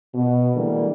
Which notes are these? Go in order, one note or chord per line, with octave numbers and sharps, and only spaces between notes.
B2
D3 E3 G3 G#3 A#3